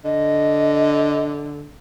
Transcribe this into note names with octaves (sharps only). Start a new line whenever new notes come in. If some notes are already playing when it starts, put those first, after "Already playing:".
D3 D#5